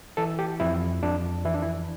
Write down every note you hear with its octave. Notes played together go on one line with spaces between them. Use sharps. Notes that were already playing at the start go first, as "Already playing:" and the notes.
E3 A4
G4
F2 E4
F2 D4
E3 E4
D4
E4